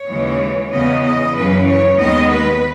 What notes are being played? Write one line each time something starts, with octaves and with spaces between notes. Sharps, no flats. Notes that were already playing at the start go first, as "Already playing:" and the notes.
Already playing: C#5
D#2 C#3 E3 G#3
E2 C#3 E3 B3 D#5
D#5
F#2 C#3 E3 B4
C#5
D#2 D#3 G#3 B3 D#5
B4